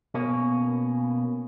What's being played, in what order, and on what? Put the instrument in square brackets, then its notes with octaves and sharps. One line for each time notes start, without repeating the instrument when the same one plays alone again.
[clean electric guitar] B2 A#3 C#4